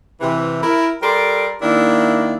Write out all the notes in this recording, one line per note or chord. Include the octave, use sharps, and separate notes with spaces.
C3 E3
E4 A#4
G3 A4 A#4 D5 C6
D#3 A#3 D4 E4